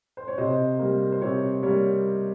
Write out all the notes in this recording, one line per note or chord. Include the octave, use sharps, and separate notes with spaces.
C5
C#5
C3 C5 D#5
G3 A#3
C5
C3 C#5
G3 A#3 C#5